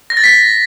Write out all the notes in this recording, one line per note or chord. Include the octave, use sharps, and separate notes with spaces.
A#6
A6
B6